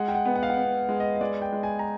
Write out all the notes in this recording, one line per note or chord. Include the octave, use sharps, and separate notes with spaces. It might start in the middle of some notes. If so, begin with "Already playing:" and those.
Already playing: G#3 F#5
G5
F#5
B3
F#5
F5
F#5
B3
G#3
D#5
D#5
G#3 D5
G5
G#3
G#5
A#5